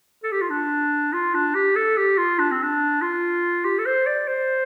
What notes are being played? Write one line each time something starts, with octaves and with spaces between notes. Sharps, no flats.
A4
G4
F4
D4
F4
D4
G4
A4
G4
F4
D4
C4
D4
F4
G4
A4
C5
D5
C5